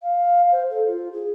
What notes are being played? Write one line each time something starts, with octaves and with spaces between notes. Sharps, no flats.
F5
C5
A4
F4
G#4